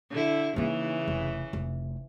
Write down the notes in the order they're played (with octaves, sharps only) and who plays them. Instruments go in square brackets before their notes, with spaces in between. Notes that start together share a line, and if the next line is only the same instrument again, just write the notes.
[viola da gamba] D3 E4
[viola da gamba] C#3 E3 [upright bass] A#3 D#4
[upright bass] F1
F1